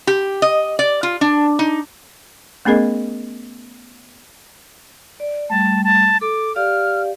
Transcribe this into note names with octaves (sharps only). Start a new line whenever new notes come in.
G4
D#5
D5
F4
D4
D#4
A3 B3 C#4 G#4 A#4 D#5
D5
G3 A3 A5
A5
A4 D6
G4 D5 F5 F6